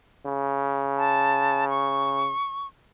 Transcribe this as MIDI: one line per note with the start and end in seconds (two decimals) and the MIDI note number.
0.26 2.33 49
0.98 1.68 81
1.69 2.67 85